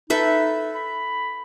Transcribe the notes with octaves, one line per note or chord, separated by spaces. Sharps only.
D#4 A4 B4 E5
B5